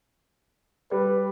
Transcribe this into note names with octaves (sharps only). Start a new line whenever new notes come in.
G3 B4